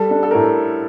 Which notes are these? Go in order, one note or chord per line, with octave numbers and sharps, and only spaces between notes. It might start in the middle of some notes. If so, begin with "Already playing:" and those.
Already playing: G3 A4
D4
A4
A#4
A2